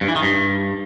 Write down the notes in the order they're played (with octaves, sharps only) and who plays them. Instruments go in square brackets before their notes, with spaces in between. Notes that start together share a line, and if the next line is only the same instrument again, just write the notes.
[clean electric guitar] G2
E3
D#3
G2